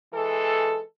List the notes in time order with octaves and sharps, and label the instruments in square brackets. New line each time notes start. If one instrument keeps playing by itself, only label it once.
[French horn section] E3 G#3 A4